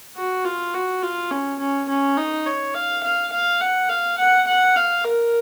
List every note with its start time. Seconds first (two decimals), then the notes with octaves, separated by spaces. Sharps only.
0.17 F#4
0.45 F4
0.74 F#4
1.03 F4
1.31 C#4
1.60 C#4
1.89 C#4
2.18 D#4
2.46 C#5
2.75 F5
3.04 F5
3.32 F5
3.61 F#5
3.90 F5
4.18 F#5
4.47 F#5
4.76 F5
5.05 A#4